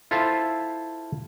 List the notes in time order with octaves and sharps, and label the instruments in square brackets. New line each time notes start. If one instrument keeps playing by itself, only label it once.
[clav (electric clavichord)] E4 F4 A4 C5 E5 F5